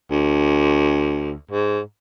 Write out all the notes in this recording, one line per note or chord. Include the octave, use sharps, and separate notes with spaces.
D2
G#2